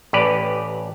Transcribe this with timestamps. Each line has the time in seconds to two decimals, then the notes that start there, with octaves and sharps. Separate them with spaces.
0.13 A1 G4 B4 D5